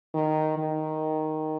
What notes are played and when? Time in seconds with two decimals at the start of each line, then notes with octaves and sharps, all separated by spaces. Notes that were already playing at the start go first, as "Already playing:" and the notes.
0.14 D#3
0.58 D#3